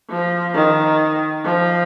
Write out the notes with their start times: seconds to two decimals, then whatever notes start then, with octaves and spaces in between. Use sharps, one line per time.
0.10 F3
0.55 D#3
1.45 F3